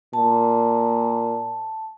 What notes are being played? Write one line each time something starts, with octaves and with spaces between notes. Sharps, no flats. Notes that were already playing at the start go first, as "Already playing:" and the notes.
A#2 A5